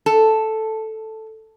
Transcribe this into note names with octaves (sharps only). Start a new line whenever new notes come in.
A4